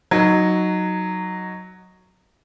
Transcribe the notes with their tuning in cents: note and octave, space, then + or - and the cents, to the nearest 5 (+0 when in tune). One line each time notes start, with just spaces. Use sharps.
F#3 +0 D#4 +0